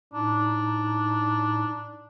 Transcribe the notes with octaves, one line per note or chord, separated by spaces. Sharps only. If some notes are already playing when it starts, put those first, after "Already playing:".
A2 D4 D#4